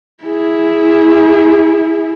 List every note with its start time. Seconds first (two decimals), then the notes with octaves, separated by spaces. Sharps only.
0.23 E4 G#4